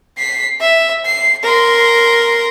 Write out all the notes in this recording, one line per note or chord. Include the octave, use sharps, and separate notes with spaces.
B6 C7
E5
C7
A#4 C6